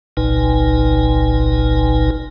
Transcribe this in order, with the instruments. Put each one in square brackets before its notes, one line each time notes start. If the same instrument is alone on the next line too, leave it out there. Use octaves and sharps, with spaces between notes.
[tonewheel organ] G1 C2 A#2 D#4 B4 G#5